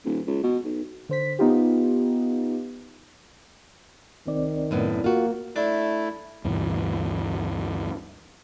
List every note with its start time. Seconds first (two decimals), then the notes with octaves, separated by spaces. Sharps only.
0.05 D#1
0.27 C#2
0.43 B2
0.65 B1
1.09 D3 C5 B6
1.39 B3 D#4 F4 G4
4.27 C2 D#3 C4 D5
4.71 F#2 A2 B3
5.04 A#3 F4 F#4
5.56 A3 D4 E4
6.44 D2 G2 B2 E3